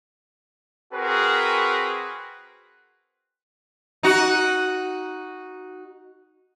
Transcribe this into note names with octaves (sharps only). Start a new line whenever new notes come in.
C4 F#4 G#4 A#4 B4
D#4 F#4